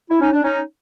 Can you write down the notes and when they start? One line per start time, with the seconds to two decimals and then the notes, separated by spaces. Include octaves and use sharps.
0.10 E4
0.20 C#4 D#4
0.33 D4
0.43 C#4 D#4